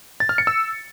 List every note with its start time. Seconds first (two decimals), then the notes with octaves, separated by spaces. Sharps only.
0.20 A6
0.29 F6
0.38 C#7
0.47 E6